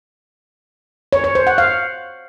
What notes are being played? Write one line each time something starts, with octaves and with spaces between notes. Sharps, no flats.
C#5
C#5
C5
F#5
F5